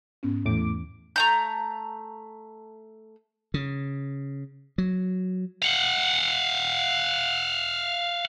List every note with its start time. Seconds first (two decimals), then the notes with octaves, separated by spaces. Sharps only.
0.23 G#2 B3 C#4
0.45 E2 A2 E3 D6
1.16 A3 A#5 G6
3.54 C#3
4.78 F#3
5.62 F5 F#5